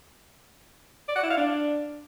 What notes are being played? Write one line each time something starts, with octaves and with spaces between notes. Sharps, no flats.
D5
F#5
E4
F5
D4